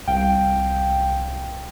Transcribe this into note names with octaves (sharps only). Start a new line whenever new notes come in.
C2 F5 G5